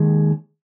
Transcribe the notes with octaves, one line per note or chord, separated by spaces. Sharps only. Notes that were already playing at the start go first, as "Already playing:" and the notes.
Already playing: D#2 D#3 G#3